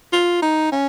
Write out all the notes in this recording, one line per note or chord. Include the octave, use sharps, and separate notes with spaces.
F4
D#4
C#4